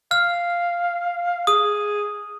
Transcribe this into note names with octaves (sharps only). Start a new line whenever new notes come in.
F5 F6
G#4 D#6